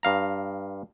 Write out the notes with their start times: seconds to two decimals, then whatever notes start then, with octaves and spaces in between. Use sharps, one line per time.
0.03 G2 F5 A#5